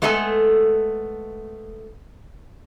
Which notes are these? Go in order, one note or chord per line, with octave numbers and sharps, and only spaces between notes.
G#3 A3 B3 A4 F#5 G#5